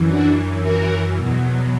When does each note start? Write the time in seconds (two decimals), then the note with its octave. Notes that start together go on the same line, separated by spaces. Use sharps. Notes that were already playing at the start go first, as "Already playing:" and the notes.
Already playing: F#2 E3
0.09 D4 F#4
0.62 F#4 A#4
1.15 E2 B2 F#3